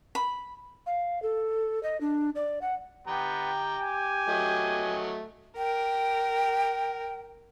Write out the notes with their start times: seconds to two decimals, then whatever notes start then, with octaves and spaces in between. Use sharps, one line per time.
0.15 B5
0.86 F5
1.23 A4
1.83 D#5
2.01 D4
2.35 D5
2.62 F#5
3.07 B3 G4 G5 A#5
3.80 G#5
4.28 F#3 A3 D#5
5.57 A#4 G5